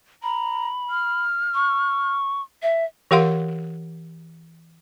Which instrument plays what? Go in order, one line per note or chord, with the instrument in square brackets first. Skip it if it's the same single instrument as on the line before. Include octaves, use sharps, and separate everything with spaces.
[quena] A#5 [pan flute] B5
[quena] F6
[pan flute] C#6
E5
[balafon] E3 G4 A#4 F5 F#5 C6